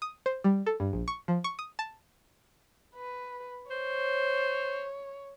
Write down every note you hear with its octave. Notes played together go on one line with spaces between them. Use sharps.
D#6
C5
G3
A4
G2
A#1
C#6
F3
C#6
D#6
A5
B4
C5 C#5